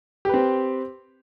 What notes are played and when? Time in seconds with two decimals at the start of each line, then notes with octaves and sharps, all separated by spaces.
0.25 G4
0.29 B4
0.34 C4